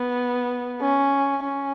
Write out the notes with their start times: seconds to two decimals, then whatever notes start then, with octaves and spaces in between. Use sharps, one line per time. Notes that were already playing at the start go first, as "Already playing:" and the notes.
Already playing: B3
0.81 C#4
1.43 C#4